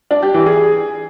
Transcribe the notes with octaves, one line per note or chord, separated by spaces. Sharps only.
D4
G4
E3
G#4